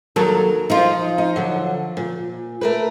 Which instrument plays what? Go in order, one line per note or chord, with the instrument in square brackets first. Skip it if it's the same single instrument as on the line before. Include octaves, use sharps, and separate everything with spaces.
[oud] D#2 F#3 A4 [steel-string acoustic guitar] A#4
[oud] F3 F4 [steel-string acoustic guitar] D#4
[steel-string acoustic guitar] D#4
D3 F#3
A#2
A3 A#4 B4